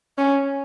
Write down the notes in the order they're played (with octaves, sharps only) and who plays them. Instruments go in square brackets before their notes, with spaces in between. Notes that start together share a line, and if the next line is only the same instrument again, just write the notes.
[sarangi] C#4